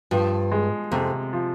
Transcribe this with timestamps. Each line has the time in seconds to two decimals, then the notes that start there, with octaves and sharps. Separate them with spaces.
0.11 G2 F3
0.52 G#3
0.92 F2 C3
1.33 F3